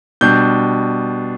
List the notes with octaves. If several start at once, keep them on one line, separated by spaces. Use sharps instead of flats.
B2 G3 D4 G6